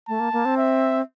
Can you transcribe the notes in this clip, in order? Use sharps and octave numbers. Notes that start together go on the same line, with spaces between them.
A3 A5
A#3
A#3
C4
E5